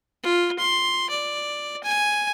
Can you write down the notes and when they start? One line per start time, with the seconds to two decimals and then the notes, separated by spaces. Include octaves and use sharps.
0.24 F4
0.59 C6
1.10 D5
1.84 G#5